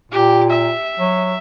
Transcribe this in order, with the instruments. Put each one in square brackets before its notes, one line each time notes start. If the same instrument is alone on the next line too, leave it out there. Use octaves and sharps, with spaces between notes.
[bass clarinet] A#2 [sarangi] G4
[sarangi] E5
[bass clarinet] F#3